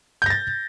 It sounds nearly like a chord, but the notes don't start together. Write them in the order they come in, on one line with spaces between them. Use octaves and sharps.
G6 A#6 A6